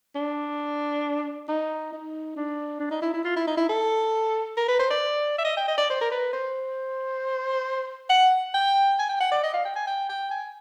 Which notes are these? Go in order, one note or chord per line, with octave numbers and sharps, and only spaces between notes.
D4
D#4
D#4
D4
D4
D#4
E4
E4
F4
E4
D#4
E4
A4
A#4
B4
C5
D5
E5
D#5
G5
D#5
D5
C5
A#4
B4
C5
F#5
G5
G#5
G5
F#5
D5
D#5
F5
G5
G#5
G5
G5
G#5